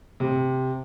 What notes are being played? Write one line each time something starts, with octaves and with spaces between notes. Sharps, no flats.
C3